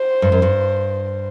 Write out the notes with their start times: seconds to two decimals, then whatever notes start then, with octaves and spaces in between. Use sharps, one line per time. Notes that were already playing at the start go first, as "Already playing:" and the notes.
Already playing: C5
0.22 G2
0.32 F#2
0.42 G2